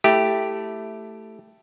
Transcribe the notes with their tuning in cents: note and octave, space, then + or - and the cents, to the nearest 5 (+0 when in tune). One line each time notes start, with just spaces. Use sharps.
A3 +0 E4 +0 G4 +0